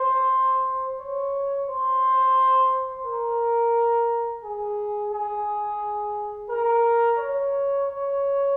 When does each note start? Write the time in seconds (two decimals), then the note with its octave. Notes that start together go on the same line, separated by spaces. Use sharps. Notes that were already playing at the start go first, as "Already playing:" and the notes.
Already playing: C5
1.00 C#5
1.69 C5
3.06 A#4
4.43 G#4
5.12 G#4
6.49 A#4
7.18 C#5
7.86 C#5